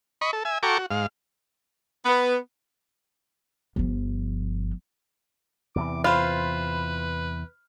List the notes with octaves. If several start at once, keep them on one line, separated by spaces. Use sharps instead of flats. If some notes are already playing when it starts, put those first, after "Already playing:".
D#5 B5 C#6
A4
E5 G#5
F#4 A4 G5 A#5 C#6 D6
F#4
G#2 F5
B3
G1 F3
E2 C3 E3 D6
F4 B4 C5 B5 F6